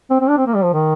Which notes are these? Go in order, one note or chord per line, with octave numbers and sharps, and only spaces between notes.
C4
C4
D4
C4
A#3
G3
F3
D#3